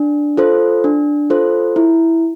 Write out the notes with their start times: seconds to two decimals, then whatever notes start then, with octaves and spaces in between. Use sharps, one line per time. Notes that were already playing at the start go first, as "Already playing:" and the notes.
Already playing: D4
0.37 F4 A4 C5
0.84 D4
1.30 F4 A4 C5
1.76 E4